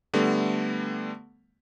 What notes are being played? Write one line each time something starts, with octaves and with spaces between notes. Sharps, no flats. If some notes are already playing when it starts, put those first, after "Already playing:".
D3 G3 A3 B3